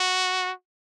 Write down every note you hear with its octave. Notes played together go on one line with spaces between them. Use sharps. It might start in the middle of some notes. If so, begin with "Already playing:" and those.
Already playing: F#4